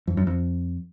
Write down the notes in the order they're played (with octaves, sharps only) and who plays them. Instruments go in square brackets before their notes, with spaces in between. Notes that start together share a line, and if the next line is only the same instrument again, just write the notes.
[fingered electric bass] F2
F#2
F2